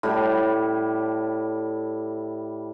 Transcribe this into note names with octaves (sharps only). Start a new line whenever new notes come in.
A2 G3